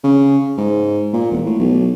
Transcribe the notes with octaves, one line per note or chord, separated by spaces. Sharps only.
C#3
G#2
A#2
E1
A2
B1